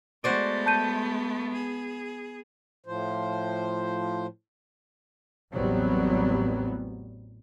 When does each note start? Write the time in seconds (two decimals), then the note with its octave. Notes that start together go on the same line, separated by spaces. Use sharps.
0.24 G#3 A3 B3 F#4 C5 D5
0.66 A5 G6 D#7
1.53 G#4
2.86 A2 F3 C5
5.54 A1 E2 F#3 G3 B3 C4